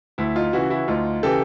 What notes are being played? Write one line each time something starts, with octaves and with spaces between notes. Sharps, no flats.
D2 E4
D#4 F4
C#3 E3 E4 F#4
E4 F#4
D2 D#4 F4
C#3 E3 G4 A4